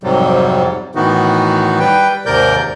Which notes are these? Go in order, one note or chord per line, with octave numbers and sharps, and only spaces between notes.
F2 G#2 C3 F#3 G3
A2 D#3 E3 B3 D#4 F#4
G3 B4 G5
D#2 G#2 C3 A#4 D5 G6